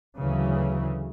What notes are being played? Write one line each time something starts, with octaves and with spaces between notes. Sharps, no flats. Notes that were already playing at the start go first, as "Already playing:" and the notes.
D2 C#3 E3 F#3